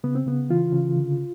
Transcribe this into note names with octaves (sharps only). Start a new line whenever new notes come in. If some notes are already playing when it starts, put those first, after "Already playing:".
C#3 B3
C4
C#3 B3
E3 F4
C#3
D3